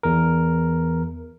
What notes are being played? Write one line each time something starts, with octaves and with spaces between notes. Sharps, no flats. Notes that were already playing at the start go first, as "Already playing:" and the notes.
E2 A#4